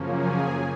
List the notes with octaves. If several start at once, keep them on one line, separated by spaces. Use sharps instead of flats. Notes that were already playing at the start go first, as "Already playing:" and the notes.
Already playing: F#2 C#3 F3 A#3 C#4
G#4 G#5